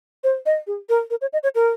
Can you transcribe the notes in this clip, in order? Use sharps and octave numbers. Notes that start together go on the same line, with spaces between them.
C5
D#5
G#4
A#4
A#4
C#5
D#5
C#5
A#4